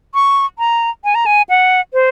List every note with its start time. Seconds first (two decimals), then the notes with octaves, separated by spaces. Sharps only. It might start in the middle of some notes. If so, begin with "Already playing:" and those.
0.14 C#6
0.59 A#5
1.04 G#5
1.15 A#5
1.26 G#5
1.49 F#5
1.93 C5